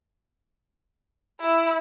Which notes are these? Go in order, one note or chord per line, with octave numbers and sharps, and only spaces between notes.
E4